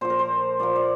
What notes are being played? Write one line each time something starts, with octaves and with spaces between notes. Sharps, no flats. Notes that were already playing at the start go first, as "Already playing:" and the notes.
A#2 F3 C5
A#4
C5
A#2 F3 D5
D5